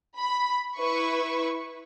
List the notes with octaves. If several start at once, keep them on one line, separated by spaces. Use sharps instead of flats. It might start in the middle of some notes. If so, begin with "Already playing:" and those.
B5
E4 B4 C#6